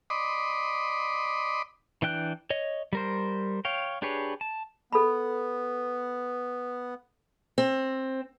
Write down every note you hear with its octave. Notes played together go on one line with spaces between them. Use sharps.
D5 D#5 B5 C6 D6 D#6
E3 D4 G5 F#6
C#5 D#5
G3 A#4 C5
C#5 F5 G5
D4 G4 G#4 B4 C#5
A5
B3 A4 B5
C4